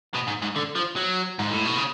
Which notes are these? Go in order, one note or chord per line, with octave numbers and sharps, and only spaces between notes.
B2
G#2
G#2
D3
F3
F#3
G#2
A2
B2
C#3